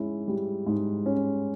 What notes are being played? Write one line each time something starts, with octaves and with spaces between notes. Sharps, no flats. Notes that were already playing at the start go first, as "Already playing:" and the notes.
Already playing: G#2 C#4 E4
G3
G#2
C#4